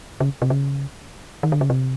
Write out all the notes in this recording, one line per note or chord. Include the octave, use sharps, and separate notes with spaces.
C#3
C3
C#3
D#3
D3
C#3
C3